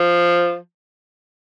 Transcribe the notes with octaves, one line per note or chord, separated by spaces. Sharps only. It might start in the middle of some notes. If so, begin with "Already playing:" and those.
Already playing: F3